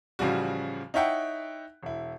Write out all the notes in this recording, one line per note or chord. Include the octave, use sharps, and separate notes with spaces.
A1 C#3 F3 G3 F#4
D#4 E4 C#5 E5 F#5 G5
E1 E4